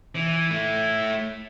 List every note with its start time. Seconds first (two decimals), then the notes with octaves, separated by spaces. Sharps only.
0.15 E3
0.51 A3 E4